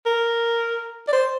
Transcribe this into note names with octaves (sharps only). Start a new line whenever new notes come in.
A#4
D5
C5